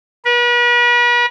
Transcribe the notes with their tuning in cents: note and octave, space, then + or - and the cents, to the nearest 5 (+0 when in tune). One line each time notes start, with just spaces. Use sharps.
B4 -40